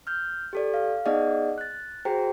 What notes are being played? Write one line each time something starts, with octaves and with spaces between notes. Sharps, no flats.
F6 G6
G4 A4 D5
F5
B3 D#4 G#4 D5 D#5 F#5
F#6 A6
F#4 G#4 C5 G5 A#5